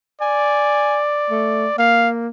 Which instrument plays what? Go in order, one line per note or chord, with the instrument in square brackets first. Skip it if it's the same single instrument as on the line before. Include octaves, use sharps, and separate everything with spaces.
[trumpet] D5 [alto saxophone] G#5
[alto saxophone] A3
[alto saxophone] A#3 [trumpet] F5